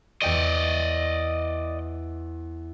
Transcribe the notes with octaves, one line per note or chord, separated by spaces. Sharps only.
E2 D5 D#5 G5 C#7